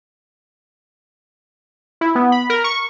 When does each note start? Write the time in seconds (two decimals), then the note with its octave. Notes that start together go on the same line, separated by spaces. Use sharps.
2.01 E4
2.15 B3
2.32 B5
2.50 A#4
2.64 C#6